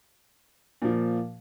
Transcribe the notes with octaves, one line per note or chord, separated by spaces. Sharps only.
A#2 F3